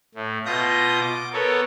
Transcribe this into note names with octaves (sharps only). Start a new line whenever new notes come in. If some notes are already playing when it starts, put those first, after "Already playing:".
A2
B2 F4 D#5 G6 A#6
D6
B3 A4 A#4 C#5